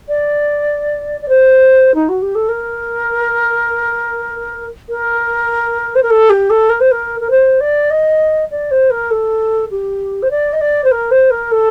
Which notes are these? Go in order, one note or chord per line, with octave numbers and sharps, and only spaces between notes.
D5
D5
C5
D#4
F#4
G4
A4
A#4
A#4
C5
A#4
A4
G4
A4
A#4
C5
A#4
A#4
C5
D5
D#5
D5
C5
A#4
A4
G4
C5
D5
D#5
D5
C5
A#4
C5
A#4
A4